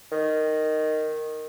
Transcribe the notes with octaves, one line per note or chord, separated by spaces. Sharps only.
D#3